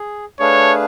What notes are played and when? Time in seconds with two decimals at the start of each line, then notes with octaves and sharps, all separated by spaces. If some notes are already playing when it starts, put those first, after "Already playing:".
Already playing: G#4
0.40 A3 D4 G#4 B4 C#5 F5